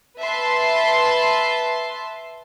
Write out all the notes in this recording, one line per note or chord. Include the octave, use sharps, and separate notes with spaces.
B4 E5 A5 C6